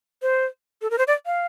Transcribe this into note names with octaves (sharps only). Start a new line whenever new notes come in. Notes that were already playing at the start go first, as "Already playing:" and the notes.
C5
A4
A#4
C5
D5
F5